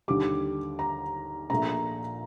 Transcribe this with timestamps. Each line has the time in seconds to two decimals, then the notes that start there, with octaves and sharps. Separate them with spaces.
0.08 D#2 D3 G3 D6
0.79 A#5
1.50 A#1 A#2 A3 A#5